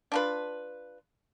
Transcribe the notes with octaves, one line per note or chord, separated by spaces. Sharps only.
D4 F4 B4